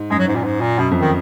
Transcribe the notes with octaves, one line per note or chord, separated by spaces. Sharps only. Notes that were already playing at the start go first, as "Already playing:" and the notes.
Already playing: G#2
F#2 G#3
F#3
G#2
A#2
G#2
A#2
F#2 B2
F2
D#3